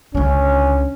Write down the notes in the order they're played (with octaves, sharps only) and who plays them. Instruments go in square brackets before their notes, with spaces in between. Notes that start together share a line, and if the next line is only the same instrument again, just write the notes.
[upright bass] C#2 D3 [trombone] C#4